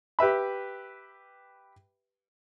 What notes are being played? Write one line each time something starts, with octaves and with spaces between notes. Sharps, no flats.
G4 B4 E5 B5